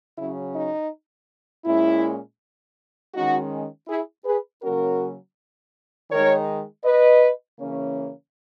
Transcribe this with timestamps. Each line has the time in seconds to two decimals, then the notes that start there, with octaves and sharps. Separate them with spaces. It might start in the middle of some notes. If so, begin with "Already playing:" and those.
0.17 C#3 F#3 C#4 E4
0.54 D#4
1.65 A#2 G#3 C#4 E4
3.14 D#3 G#3 C#4 D#4 F#4
3.88 E4 G#4
4.25 G#4 B4
4.62 C#3 F#3 A#3 C#4 F#4 A#4
6.10 D#3 G#3 D#4 A#4 C#5
6.84 B4 D#5
7.59 C#3 E3 A#3 C#4